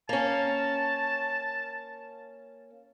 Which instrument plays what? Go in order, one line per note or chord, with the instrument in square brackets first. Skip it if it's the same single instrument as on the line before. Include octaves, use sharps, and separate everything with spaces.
[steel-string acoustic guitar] A#3 C#4 [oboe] A5